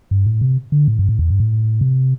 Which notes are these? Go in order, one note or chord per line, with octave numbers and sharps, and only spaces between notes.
G2
A2
C3
D3
A2
G2
A2
E2
G2
A2
C3